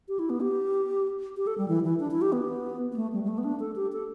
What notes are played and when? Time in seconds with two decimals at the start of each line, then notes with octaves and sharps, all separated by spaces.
0.08 G4
0.19 E4
0.30 B3
0.41 G4
1.37 G4
1.47 A4
1.58 G3
1.68 E3
1.84 E3
2.00 D4
2.11 E4
2.22 G4
2.32 B3
2.92 B3
2.96 A3
3.13 G3
3.24 G3
3.28 A3
3.38 B3
3.44 D4
3.60 A4
3.76 G4
3.92 A4